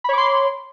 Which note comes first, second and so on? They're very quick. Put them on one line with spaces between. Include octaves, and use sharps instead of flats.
B5 C#5 D6 C6